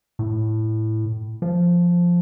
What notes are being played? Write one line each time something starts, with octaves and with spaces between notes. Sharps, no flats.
A2
F3